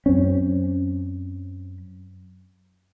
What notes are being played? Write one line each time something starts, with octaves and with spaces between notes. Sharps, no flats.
F#2 C4 C#4